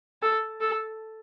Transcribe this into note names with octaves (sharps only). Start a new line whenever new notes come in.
A4
A4